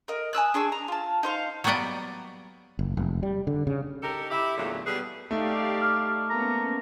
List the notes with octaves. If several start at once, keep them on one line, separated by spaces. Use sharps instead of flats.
A#4 D#5
G#5 D#6 E6 F#6
D4 G#4 C#6 E6
A#5
F4 A5
D#4 C5 F5
F#3 G3 A#3 B3 D5 D#5
F#1
F1
G3
D3
C#3
D#4 G4 A4 A#4
E4 G4
E2 A#2 D3 F#3 A3
B2 G3 G#4 A4 B4
A3 D#4 G4 D5 F5
D6 F6
A#3 B3 C#4 A#5